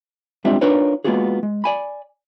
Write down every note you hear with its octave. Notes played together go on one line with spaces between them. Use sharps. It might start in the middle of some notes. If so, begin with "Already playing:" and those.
G3 G#3 C4 D4 F4 E5
D4 D#4 F4 A#4 B4 C#5
G#3 A#3 B3 F4 F#4 G#4
G#3
D5 G#5 B5